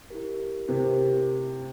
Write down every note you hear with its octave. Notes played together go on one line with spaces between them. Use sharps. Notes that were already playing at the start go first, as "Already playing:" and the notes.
E4 G4 A#4
C3 E4 G4 A#4